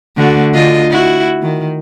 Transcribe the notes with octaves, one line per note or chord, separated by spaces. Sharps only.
D3 A3 F#4
D3 F4 D#5
E4 F#4
D#3